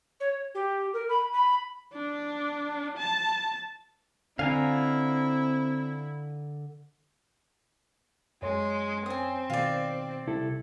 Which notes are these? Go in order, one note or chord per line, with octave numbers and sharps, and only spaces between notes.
C#5
G4
A#4
B5
B5
D4
A5
D3 C4 E4 F5 G#5 A#5
F#2 G#3 C#5 C6
C4 G#5 D#6
B2 D#3 F4 D5
C2 E4 A4